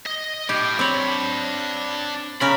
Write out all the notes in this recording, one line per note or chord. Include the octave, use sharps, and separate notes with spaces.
D#5
A2 G4
C4 D4 C#5 B5
C#3 C#4 A#4 B5